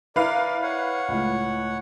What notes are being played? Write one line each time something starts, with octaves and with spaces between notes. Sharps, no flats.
E4 A#4 B4 D5 F5
C#5 F#5
C#2 A2